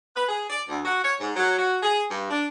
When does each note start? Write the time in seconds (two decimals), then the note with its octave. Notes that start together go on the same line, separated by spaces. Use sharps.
0.16 B4
0.28 G#4
0.50 D5
0.68 D2
0.85 F#4
1.04 C#5
1.20 G#2
1.36 F#3
1.58 F#4
1.82 G#4
2.11 G2
2.30 D4